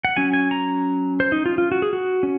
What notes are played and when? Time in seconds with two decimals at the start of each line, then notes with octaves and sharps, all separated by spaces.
0.05 F#5
0.16 F#3 C#4 G#5
0.33 G#5
0.51 A#5
1.20 C5
1.32 D#4
1.46 F4
1.58 F4
1.72 F#4
1.82 G#4
1.93 F#4
2.23 C#4